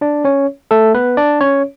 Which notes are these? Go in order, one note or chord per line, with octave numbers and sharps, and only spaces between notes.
D4 D5
C#4 C#5
A3 A4
B3 B4
D4 D5
C#4 C#5